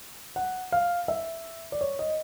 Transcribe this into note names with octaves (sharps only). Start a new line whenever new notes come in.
F#5
F5
E5
D5
C#5
D#5